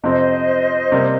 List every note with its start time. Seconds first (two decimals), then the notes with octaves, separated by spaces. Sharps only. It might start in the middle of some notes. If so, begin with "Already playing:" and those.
0.03 F2 C3 F3 C4 C5 D#5
0.92 C3 G3 A#3